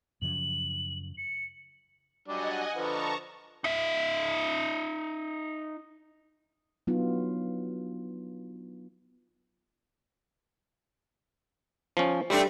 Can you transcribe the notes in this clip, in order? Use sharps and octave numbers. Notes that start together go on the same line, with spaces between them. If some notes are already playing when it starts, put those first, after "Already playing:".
F#2 C#3 F3 F#7
C#7
F#3 G3 D4 D#5 F#5 G#5
D3 F3 B4 D#5 A5 A#5 C#6
D#4 E5
F#3 B3 D4 D#4 F4
F3 C#4
G3 A3 C4 D4